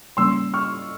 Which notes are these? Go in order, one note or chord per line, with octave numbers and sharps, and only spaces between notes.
C#3 G3 A#3 C#4 C6 E6
C#6 F6